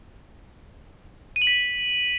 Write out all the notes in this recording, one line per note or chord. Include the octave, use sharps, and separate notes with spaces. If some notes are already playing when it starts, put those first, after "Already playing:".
D#7
F#7
B6